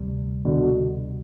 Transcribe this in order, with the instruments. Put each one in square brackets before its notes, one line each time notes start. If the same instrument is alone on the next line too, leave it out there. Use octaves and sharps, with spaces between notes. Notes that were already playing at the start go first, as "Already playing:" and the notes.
Already playing: [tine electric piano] D2 C3 G3
[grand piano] B2 D3